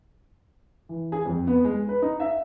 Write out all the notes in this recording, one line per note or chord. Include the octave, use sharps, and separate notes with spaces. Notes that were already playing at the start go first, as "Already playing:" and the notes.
E3
G#4
F2
B3
G#3
B4
D#4
E5